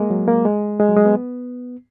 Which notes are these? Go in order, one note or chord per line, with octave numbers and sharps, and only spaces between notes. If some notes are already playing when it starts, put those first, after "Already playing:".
Already playing: G#3 A#3
F#3
A#3
G#3
G#3
F#3
G#3
B3